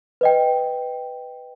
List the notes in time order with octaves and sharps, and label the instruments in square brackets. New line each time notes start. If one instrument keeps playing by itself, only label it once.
[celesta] B4 D#5 G5